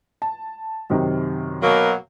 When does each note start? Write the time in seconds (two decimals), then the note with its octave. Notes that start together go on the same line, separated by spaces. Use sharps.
0.22 A5
0.90 F#2 C3 D#3
1.62 B2 F#3 A#3